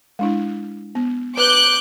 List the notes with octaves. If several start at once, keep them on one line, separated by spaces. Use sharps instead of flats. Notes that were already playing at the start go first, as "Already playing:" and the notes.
G#3 D4 E4
B3
B4 D6 F#6 G6